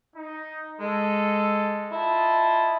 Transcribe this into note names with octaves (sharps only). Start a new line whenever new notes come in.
D#4
G#3 A4
E4 F4 D#5 A5